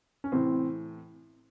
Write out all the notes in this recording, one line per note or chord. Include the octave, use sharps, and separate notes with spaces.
C#4
A2 C3 E3 C4